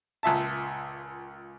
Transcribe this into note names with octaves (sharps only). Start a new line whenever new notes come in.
C#2 A#2 E5 A5